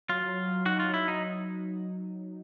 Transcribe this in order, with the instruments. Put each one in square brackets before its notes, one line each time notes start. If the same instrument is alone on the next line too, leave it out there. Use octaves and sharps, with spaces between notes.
[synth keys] F#3 [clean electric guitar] F4
[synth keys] F#3
F#3
[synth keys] D#4 [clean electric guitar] F#4
[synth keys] F#3 [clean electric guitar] F4
[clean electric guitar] E4
[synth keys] F#3
[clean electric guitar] D#4